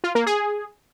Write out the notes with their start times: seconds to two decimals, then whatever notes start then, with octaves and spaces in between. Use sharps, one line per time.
0.04 F4
0.15 A#3
0.26 G#4